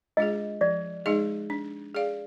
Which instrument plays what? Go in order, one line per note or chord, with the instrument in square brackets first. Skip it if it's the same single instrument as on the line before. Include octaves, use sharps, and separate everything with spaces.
[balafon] G#3 D4 F4 G#4 [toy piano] D#5
[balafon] F3 [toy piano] D5
[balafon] G#3 D#4 G#4 D#5
D4
G#4 D5 F5